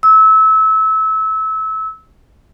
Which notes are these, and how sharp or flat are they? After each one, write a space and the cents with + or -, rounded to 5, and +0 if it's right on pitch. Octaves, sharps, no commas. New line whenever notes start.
E6 -25